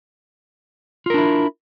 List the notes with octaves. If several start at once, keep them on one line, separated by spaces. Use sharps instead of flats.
D4 E4 F4 A#4